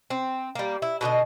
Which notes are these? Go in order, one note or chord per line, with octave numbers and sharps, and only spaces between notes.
C4
G3 A#3
E4
B2 D3 G4 D#5